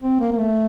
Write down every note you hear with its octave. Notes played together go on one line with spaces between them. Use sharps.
C4
A#3
A#3
A3